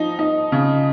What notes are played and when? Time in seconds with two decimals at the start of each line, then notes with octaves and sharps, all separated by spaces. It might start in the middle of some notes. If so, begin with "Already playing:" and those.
Already playing: F3 D#4
0.19 D#4
0.52 C#3